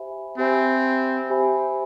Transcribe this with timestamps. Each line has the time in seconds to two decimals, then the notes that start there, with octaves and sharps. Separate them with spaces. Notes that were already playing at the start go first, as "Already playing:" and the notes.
Already playing: G4 C5 E5 G#5 B5
0.38 C4 G4 C5 E5 G#5 B5
1.30 G4 C5 E5 G#5 B5